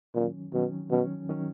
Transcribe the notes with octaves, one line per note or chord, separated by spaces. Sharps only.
A#2 D#3 F#3 C#4
B2 D#3 F#3 C#4
B2 D#3 F#3 C#4
D#3 F#3 C#4